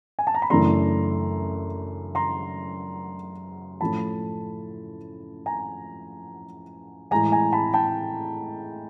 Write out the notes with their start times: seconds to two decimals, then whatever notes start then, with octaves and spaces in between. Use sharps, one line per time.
0.19 G#5
0.27 A5
0.34 A#5
0.42 B5
0.50 F#2 C#3 E3 A3 D4 A#5 C6
2.15 A#5 C6
3.81 A2 F3 A3 C#4 A5 B5
5.46 G#5 A#5
7.11 A2 E3 G#3 G#5 A#5
7.32 G#5 A#5
7.53 A5 B5
7.74 G5 A5